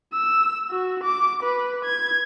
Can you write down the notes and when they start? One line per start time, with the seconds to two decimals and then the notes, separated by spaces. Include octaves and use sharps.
0.14 E6
0.71 F#4
1.03 D6
1.43 B4
1.85 G#6